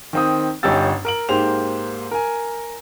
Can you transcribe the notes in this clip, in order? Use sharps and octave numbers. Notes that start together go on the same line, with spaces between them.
D#3 C4 D#6
G1 C#4 D#4 G4 E6 A6
A#4 D7 F#7
G#2 A#3 G4 C5 F7
A#4 G#5